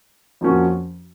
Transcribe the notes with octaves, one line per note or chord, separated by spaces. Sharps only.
F2 F3 A#3 C#4 F#4